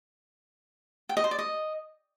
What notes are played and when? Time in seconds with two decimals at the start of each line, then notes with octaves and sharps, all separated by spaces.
1.09 G5
1.17 D#5
1.24 C5
1.31 D5
1.39 D#5